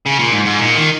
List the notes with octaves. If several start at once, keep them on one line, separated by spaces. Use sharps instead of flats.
C#3
A#2
G#2
G#2
A#2
D#3